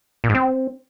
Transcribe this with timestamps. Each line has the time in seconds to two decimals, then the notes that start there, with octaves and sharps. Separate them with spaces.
0.24 A#2
0.29 G#2
0.35 C4